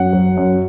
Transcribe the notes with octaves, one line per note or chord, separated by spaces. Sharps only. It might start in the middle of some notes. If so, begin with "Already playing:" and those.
Already playing: F#2 F#5
F#3
F#2